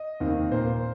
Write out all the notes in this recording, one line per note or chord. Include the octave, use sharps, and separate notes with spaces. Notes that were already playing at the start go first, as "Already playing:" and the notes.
Already playing: D#5
D#2 D#3 C4
A#2 A#3 C5